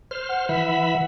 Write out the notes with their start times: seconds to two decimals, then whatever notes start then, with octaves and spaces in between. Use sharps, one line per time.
0.11 C5 F6
0.29 F#5
0.49 E3 E5 B5